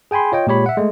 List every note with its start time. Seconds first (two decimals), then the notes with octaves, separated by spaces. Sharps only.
0.11 G#4 G5 G#5 B5 C6
0.32 F4 C#5 D#5 G5
0.47 A#2 G#3 G4 C#5 B5
0.66 E5 F#5
0.77 G#3 A3